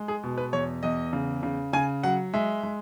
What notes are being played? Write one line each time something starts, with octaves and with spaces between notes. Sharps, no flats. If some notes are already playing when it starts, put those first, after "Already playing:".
Already playing: G#3
G#4
B2
B4
E2 C#5
E2 D#5
C#3
C#3
C#3 G#5
F#3 F#5
G#3 E5
G#3